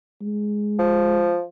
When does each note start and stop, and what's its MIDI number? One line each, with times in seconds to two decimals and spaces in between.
0.22 1.34 56
0.79 1.43 53